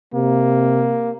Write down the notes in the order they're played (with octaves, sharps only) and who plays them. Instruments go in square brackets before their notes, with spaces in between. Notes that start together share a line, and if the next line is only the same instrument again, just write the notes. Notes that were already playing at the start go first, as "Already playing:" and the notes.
[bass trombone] C3 [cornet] A#3